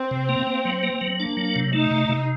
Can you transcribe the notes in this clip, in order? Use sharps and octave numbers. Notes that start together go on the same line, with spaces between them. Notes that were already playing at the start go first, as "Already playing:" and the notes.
Already playing: C4
C3
A#3
A#3
F#3
A#3
F#3
A#3 D4
F#3
C3
A3 D#4
C3
C3